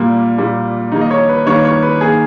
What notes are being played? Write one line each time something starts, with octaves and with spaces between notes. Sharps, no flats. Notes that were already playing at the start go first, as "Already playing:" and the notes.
Already playing: A#2 G3 A#3
A#2 G3 A#3
D#3 G3 A#3 D#4
D#5
C#5
B4
D#3 G3 A#3 C#5
C#5
B4
D#3 A#3 G#4